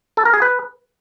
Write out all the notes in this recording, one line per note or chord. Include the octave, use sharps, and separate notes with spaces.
A4
A#4
G#4
B4